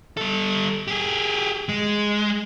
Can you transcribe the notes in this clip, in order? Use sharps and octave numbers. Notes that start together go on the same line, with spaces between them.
G3 A4
G4 G#4
G#3